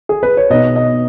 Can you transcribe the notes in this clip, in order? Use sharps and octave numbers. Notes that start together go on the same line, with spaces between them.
G#4
B4
C#5
B2 B3 D#4 D#5
D#5